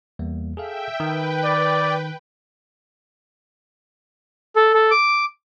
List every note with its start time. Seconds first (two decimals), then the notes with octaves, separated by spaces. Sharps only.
0.19 E2 G3 A#3
0.57 G#4 A4 E5 F5 G5
1.00 D#3 B4 G5
1.44 D5
4.56 A4
4.74 A4
4.91 D6